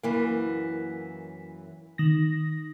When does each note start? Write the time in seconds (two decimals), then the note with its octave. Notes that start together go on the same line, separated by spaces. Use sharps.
0.03 F#2 E3 A#3
1.98 D#3 A#6